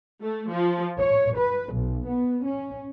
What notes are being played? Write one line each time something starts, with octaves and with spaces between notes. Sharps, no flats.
A3
F3
C#5
B4
B1
B3
C#4